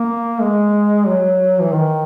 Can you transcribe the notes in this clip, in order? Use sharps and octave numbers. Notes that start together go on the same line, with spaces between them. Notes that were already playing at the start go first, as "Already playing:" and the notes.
Already playing: A#3
G#3
F#3
E3
D#3